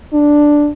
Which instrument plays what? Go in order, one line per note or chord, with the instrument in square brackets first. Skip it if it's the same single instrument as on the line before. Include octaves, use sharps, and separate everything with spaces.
[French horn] D4